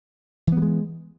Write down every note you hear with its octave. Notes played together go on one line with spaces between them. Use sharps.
E3 G3 G#3 B3